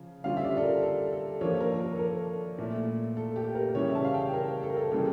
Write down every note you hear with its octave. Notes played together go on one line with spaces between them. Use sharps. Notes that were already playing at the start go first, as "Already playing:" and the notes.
Already playing: C#3 F3
D3 G3 C#4 F4 F5
E5
D5
A4
A#4
A4
A4
F3 A#3 D4 C#5
A#4
A#4
A4
A#4
A#2 A3 E4
A4
G4
A#4
C#3 E3 G3 C#4 E4 C#5
A5
F5
G5
A#4
A4
A#4
A4
C#3 E3 G3 G4